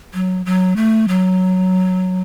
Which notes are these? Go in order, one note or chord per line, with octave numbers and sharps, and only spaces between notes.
F#3
F#3
A3
F#3